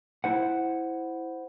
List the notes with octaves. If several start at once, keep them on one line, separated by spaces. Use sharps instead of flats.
E4 C5 F#5